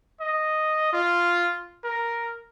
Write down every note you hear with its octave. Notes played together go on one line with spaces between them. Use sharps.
D#5
F4
A#4